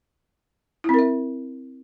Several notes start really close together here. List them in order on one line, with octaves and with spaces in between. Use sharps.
E4 C4 A#4 E5